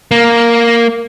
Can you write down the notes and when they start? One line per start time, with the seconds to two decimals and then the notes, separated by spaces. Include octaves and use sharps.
0.11 A#3